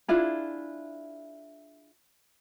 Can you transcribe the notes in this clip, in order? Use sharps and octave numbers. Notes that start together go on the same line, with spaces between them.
D4 E4 F4 G#4